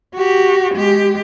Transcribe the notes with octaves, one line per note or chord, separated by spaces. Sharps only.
F#4 G4
G#3 G4